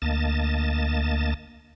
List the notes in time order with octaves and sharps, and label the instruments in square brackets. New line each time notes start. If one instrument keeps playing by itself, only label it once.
[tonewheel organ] D2 A#3 D#5 A5 A6